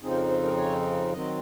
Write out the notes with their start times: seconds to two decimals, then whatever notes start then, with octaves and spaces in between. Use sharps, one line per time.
0.02 F2 C#3 F3 C4 D#4 G#4
0.10 C5
0.16 A#4
0.30 C5
0.44 A#4
0.57 C#5
1.12 D#3 F#3 C4 D#5